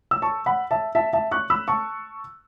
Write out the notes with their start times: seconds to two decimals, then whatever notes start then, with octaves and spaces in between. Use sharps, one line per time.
0.11 E6
0.22 A5 C#6
0.46 F#5 B5
0.71 E5 A5
0.95 E5 A5
1.13 E5 A5
1.31 C#6 F#6
1.50 B5 E6
1.68 A5 C#6